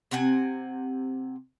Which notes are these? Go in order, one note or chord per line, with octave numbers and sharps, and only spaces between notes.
C3 C4 F#5 G#5